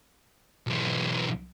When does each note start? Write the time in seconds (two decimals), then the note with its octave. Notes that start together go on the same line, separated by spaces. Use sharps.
0.67 B1 E3